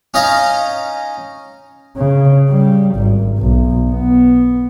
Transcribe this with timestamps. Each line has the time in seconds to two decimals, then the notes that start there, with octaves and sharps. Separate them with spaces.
0.14 C#4 D#4 D#5 F5
1.96 C#3
2.49 G3
2.96 G#1
3.39 B1
3.91 B3